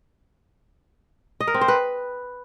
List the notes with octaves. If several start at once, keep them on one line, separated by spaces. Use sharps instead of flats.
D#5
A#4
C4
C5
B4